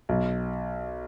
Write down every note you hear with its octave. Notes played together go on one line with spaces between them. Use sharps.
B1